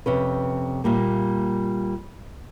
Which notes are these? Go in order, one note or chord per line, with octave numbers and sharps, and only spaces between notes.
F2 C3 C#4 B4
A#2 G3 A#3